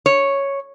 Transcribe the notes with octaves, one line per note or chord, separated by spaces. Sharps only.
C#5